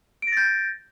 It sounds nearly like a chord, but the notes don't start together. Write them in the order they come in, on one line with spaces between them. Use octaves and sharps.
D7 A#6 A6 G6